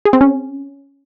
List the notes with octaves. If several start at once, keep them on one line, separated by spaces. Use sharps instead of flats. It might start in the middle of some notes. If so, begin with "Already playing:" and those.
G#4
C4
C#4